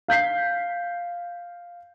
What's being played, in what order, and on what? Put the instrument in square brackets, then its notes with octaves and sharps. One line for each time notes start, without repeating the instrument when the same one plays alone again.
[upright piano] F5 G6 B6 C7